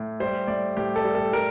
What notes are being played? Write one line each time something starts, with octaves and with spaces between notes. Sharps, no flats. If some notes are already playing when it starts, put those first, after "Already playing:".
Already playing: A2
G3 C5
A2 D5
A2 G4
A4
G3
A4
G3 A#4